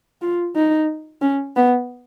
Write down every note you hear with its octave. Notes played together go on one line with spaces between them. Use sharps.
F4
D#4
C#4
B3